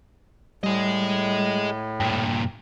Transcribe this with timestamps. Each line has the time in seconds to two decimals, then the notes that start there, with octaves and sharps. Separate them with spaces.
0.64 A2 G3 G#4 D#5
2.00 G2 A#2 G5